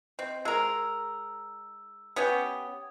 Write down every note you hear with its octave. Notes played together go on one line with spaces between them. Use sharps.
C4 D#5
G#3 A#4 E6
B3 C#4 G4 D#6 G#6